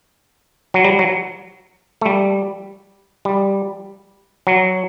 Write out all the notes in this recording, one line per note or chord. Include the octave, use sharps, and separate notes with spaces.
F#3
G3
F#3
A3
G3
G3
F#3